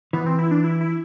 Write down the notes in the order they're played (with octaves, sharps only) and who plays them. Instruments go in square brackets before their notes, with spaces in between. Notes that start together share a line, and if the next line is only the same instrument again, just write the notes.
[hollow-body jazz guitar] E3 [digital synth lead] B3
[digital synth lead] C4
E4
D4
E4
E4